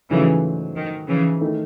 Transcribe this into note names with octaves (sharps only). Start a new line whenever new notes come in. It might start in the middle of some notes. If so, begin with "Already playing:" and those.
G#2 C#3 E3 F#3 A3
D#3
C#3 E3
D#3 A3